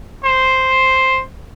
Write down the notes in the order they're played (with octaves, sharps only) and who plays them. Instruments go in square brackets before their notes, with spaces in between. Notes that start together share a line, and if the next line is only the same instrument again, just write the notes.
[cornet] C5